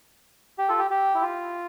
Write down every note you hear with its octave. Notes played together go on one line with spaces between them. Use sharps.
G4
F4 A4
G4
G4
E4
F4